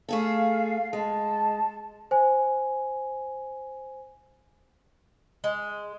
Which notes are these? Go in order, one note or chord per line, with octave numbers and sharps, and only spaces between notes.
A3 G#4 A4 F5
G#3 A5
C5 G#5
G#3